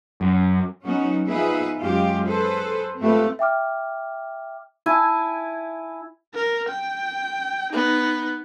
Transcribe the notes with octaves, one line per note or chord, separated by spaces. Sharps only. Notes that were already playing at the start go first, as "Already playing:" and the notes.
F#2
F#3 B3 C#4 D#4 F#4
F3 B3 D#4 G#4 B4 E5
F#2 G#3 F4 G4
G#4 A4 B4 C5
G#2 A3 C4 F4 G4 B4
E5 G5 D6 F6
E4 G#5 A5
A#4
G5
B3 D#4